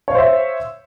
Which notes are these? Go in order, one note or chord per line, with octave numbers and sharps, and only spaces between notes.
C5 C#5 E5 F5